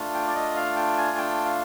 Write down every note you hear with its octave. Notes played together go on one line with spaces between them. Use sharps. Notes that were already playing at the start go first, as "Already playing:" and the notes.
Already playing: A3 D4 F4
G5
D5
D#5
F5
G5
G#5
G5
F5